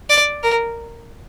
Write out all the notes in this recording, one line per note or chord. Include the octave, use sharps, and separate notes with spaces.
D5
A#4